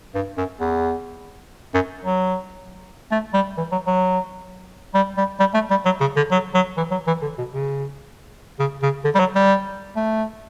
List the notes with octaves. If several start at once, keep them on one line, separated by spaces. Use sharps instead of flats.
G2
F#2
E2
F#2
F#3
A3
G3
E3
F#3
F#3
G3
G3
G3
A3
G3
F#3
C#3
D3
F#3
F#3
E3
F#3
E3
D3
B2
C#3
C#3
C#3
D3
G3
F#3
G3
A3